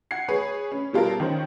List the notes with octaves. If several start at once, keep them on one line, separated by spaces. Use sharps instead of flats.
F#5 G#6 C7
G#4 B4 C#5
C#4
B2 G3 F4 A4 A#4
D#3 C#4 C5